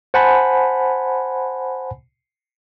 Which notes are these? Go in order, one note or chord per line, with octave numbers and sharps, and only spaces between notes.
C5 F#5 G#5 A5 B5